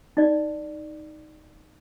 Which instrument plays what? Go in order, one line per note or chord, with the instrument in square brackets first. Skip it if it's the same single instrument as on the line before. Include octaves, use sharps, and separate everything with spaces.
[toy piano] D#4 D5